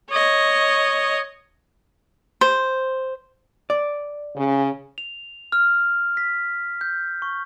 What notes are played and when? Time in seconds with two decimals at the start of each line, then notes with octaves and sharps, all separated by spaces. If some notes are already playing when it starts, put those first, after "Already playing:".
0.11 C#5 D#5
2.41 C5
3.70 D5
4.36 C#3
4.98 F7
5.52 F6
6.17 B6
6.81 G6
7.22 C#6